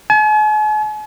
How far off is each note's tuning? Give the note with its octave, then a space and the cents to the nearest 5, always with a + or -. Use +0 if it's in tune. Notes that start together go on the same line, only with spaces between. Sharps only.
G#5 +45